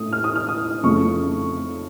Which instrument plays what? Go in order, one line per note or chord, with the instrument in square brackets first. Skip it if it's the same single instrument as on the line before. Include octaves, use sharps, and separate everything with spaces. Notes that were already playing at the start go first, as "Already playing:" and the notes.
Already playing: [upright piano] A2 A3 D#6
F6
D#6
F6
D#6
F2 C#3 A3 C#4 C#6